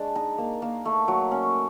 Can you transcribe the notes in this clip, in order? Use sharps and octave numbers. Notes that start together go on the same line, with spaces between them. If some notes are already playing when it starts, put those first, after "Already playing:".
Already playing: G#3 D4
D#4 A#5
A#3
A#3
A3
F#3
C#4